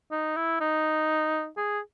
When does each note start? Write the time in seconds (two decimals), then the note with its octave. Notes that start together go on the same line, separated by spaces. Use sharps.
0.11 D#4
0.36 E4
0.61 D#4
1.57 G#4